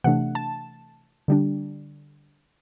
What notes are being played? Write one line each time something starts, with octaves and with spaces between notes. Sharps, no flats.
C3 E3 A3 D4 F#5
A5
D3 G3 D4